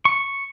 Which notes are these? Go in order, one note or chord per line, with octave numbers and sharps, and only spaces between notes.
C#6